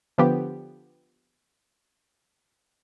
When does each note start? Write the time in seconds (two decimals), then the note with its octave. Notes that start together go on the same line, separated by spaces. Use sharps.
0.18 D3 F3 B3 G4